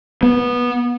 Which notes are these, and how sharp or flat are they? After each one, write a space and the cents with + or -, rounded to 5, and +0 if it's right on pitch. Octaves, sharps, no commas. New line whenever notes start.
B3 -15